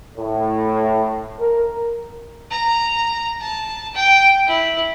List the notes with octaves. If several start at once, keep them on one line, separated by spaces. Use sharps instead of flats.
A2
A#4
A#5
A5
G5
E4